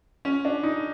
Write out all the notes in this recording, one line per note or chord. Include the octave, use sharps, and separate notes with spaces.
C#4
D4
D#4